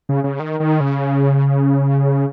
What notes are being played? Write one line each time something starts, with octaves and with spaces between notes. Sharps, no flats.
C#3
C#3
D#3
D#3
C#3